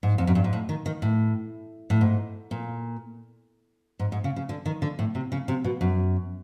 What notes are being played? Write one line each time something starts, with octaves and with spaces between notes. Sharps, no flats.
G#2
F2
F#2
G2
G#2
A2
D#3
D#3
A2
A2
G#2
A#2
G#2
G#2
C#3
C#3
D3
D#3
D3
A2
C3
C#3
C3
B2
F#2